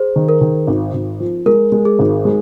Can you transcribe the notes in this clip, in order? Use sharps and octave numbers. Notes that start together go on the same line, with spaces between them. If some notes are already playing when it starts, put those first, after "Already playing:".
Already playing: G#4 C5
D#3
A#4
D#3
G#1
G#1
F3
G#3 A#4
G#3
G#4
G#1
G#3